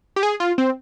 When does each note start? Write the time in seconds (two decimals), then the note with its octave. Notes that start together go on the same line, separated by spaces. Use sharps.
0.16 G4
0.23 G#4
0.40 F4
0.58 C4